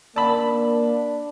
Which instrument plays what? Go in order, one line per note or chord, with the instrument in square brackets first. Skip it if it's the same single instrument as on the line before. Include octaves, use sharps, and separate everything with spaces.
[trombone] A#3 [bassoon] D4 [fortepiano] A5 B5